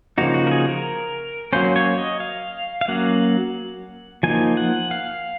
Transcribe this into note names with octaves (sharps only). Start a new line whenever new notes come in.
C#3 F3 A#3 D#4 F#4
F#4
A#4
G#4
A#4
F#3 A#3 C#4 C5
C#5
D#5
F5
F5
F#3 A#3 C#4 F#5
F3 A#3 D#4 G#5
F#5
F5